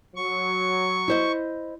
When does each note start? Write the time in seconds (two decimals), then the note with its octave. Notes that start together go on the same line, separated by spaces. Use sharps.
0.15 F#3 C#6
1.08 E4 C5 D#5